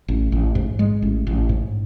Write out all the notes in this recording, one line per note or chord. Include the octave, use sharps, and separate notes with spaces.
A1
A1
G#2
G#3
A1
A1
G#2